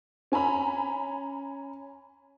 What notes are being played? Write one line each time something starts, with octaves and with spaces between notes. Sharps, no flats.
C#4 G#5 A#5 B5